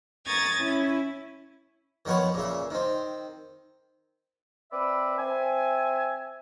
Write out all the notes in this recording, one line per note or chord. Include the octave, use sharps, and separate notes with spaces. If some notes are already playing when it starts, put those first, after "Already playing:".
A#5 C#6 D#6 G#6 A6
C#4 E4
D#3 F3 B3 B4 C#5
A#2 C#3 E5
D#3 C4
C4 B4 D5 E5
C4 E5 G#5